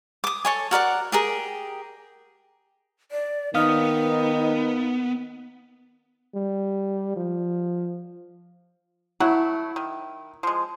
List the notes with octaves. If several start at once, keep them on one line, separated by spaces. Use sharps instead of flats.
D6 D#6
A4 C#5 G#5
F#4 A#4 D5 F#5
G4 G#4 A#4
D5
D#3 B3 D#4 F5 D#6 F6
G3
F3
F#3 A3 E4 F#5
D#3
F3 G#3